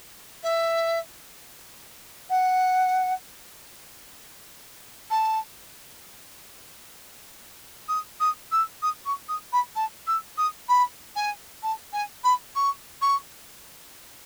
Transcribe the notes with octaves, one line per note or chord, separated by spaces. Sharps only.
E5
F#5
A5
D#6
D#6
E6
D#6
C#6
D#6
B5
A5
E6
D#6
B5
G#5
A5
G#5
B5
C#6
C#6